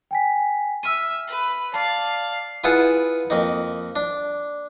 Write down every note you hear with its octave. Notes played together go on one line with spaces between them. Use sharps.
G5 G#5 B6
E5 E6 F6 D#7
B4
D5 F5 A5
E4 F4 G#4 B4 F#5 A5
F2 A#3 D#4
D4